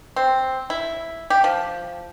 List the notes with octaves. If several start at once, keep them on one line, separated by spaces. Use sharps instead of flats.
C4
E4
G4
F3